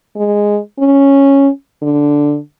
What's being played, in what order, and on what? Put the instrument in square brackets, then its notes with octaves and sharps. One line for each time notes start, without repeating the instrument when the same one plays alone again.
[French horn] G#3
C#4
D3